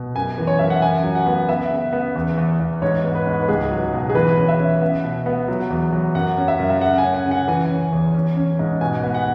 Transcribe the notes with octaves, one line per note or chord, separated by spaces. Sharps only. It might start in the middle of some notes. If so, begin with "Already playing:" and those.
Already playing: B2
F#2 G#5
E3
C#5
F#2 E5
F#5
F#2 G#5
F#3
F#5
B3
B3 E5
C#3
B3
E2
E2
E2
G#2 C#5
B3
B4
G#2
B4
C#2 G#4
F#3
B2
G#4
E3 B4
C#4
E5
C#4
B3
B2
B3
F#3
E2
F#3
F#2 F#5
C#4
E5
F#2
E5
C#3 F#5
G#5
C#4
F#5
C#3
F#5
E3 G#5
C#4
E2
C#4
C#4
G#2
B2 G#5
B3
F#5